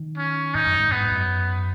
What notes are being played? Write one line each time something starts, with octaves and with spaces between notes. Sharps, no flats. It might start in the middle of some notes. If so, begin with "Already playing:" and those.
Already playing: D#3
C#4
G#2 D#4
F#2
G#2
G#2 B3
F#2